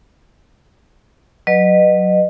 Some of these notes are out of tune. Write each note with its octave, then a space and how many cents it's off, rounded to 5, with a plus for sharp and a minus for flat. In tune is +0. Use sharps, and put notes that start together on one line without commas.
F#3 -5 B4 +0 D#5 -25